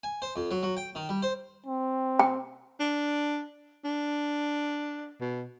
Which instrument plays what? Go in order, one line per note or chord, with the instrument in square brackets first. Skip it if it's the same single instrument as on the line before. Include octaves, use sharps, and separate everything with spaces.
[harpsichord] G#5
C5
F2
F#3
F#3
G5
D#3
G3
C5
[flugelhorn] C4
[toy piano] G5
[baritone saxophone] D4
D4
B2